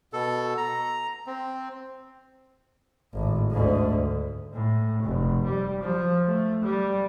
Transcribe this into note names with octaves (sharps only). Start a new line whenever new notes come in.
B2 A4
A#5
C4
G#1 A2
D2 G#2
A2
F1
G3
F3
A3
G3